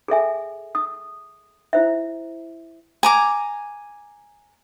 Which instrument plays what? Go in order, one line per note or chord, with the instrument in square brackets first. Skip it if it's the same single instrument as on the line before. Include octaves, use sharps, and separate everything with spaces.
[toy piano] G#4 A4 E5 G#5
D#6
E4 C5 E5
[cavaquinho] G#5 A#5 D6